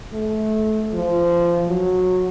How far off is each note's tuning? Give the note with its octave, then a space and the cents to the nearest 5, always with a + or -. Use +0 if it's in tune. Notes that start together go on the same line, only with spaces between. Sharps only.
A3 -25
F3 -20
F#3 -15